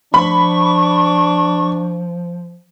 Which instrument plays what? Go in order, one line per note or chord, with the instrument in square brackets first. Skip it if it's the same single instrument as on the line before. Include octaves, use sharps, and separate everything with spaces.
[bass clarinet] F3 [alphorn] D4 [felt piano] B5 [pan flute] C#6